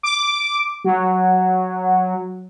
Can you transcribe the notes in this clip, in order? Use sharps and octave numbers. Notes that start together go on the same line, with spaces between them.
D6
F#3